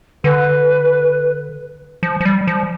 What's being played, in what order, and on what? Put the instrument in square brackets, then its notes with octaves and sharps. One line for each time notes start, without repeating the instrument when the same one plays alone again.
[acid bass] D3 [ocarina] B4
[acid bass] F3
F3
G3
F3